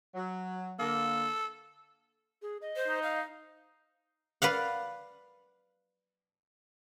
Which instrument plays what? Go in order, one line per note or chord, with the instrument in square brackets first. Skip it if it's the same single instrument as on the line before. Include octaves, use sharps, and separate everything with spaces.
[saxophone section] F#3
[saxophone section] D3 A#3 [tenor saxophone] A4
[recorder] G#4
D#5
[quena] C5
[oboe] D#4
[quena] F5
[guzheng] B4 D5 F5 F#5